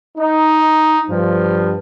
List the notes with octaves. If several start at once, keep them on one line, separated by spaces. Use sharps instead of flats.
D#4
G2 F3